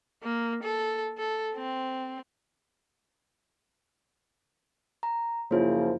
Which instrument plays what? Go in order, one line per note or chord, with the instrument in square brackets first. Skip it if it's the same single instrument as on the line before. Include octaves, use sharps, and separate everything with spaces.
[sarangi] A#3
A4
A4
C4
[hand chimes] A#5
[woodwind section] F#2 C#3 F3 [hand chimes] A#3 E4 F4